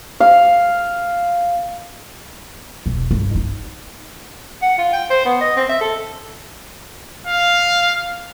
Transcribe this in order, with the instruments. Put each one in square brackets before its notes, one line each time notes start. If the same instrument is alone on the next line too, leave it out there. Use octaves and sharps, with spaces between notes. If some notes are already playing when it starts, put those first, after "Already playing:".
[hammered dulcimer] F5
[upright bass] E1
G2
D#4
[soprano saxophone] F#5
F4
G5
C5
B3
D#5
C4
E5
A4
[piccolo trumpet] F5